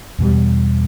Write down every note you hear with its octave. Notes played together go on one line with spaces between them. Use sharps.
E2 B2 G3